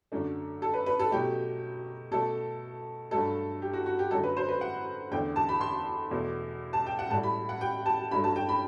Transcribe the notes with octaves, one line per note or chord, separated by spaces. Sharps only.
F#2 D3 A3
A4
B4
B4
A4
B2 F#3 A3 G4
B2 A3 A4
G2 F#3 A3 A4
G4
F#4
F#4
G4
F#2 D3 F#3 A3 A4
B4
C5
B4
F#5
E2 D3 A3 G5
A5
B5
C6
E2 B2 A3
A5
G5
F#5
A2 G3 A5
B5
F#5
G5
A5
G2 F#3 A3 B5
A5
G5
B5